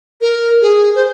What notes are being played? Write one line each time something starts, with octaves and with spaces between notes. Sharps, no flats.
A#4
G#4
C5